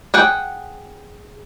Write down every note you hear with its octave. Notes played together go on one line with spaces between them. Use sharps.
G#4 F#5 G5